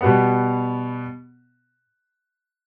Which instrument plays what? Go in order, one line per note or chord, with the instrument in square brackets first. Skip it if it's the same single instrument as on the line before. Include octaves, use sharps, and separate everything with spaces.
[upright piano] B2 G3 B3